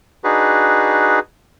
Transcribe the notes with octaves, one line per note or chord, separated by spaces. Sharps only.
D4 D#4 F#4 G#4 B4